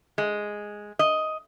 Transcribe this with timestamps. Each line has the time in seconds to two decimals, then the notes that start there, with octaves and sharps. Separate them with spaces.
0.18 G#3
0.99 D#5